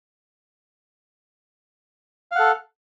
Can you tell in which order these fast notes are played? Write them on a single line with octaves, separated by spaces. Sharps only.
F5 F#5 A4